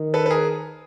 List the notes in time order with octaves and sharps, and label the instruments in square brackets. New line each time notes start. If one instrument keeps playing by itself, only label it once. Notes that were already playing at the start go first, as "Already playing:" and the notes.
Already playing: [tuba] D#3
[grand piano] A4 B4
B4
G#4 A#4